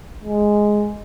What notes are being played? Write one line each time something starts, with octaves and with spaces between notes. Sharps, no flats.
G#3